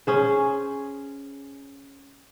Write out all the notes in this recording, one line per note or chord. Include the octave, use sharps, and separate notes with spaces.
C#4 G#4 C5